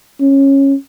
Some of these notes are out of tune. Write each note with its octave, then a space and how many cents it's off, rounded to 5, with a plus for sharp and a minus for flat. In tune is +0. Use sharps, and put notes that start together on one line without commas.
C#4 -15